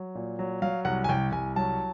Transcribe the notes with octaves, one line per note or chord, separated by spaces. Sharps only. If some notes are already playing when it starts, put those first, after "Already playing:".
Already playing: F#3
A#2
F#3
F#3 F5
C2 F#5
G#5
C2 G5
C2 G#5
F#3 A5